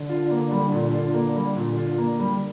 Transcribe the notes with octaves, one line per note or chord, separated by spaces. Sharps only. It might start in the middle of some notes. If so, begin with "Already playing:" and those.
Already playing: D3
F4
A#3
G3
A#2
F4
A#3
G3
A#2
F4
A#3
G3